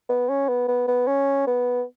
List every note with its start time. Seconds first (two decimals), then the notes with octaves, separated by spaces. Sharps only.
0.09 B3
0.29 C#4
0.48 B3
0.68 B3
0.88 B3
1.07 C#4
1.47 B3